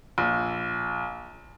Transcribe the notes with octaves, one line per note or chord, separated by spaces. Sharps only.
A#1